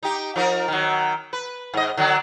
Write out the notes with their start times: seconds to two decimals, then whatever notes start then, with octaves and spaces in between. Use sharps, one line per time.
0.03 D#4 G4
0.36 F3 D#4 A#4
0.68 D#3 F#3
1.33 B4
1.74 G#2 D#5
1.97 D3 F#3 D4